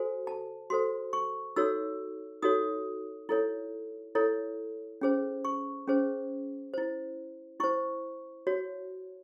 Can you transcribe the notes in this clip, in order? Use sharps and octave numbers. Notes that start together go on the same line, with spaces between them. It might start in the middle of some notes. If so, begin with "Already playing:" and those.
Already playing: F#4 A4 C5 G#5
A5
F#4 A4 C5 C6
C#6
D#4 F#4 A4 C#5 E6
D#4 F#4 A4 C#5 D#6
E4 A4 C#5
E4 A4 C#5
C#4 G#4 C5
C#6
C#4 G#4 C5
E4 C5
E4 C5 C#6
F#4 C#5